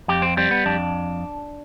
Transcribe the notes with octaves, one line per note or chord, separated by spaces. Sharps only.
F2 G4
C4
G3 C4
B3
F2 D4